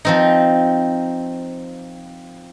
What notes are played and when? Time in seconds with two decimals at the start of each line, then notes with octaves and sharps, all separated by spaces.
0.05 F3 C4 D#4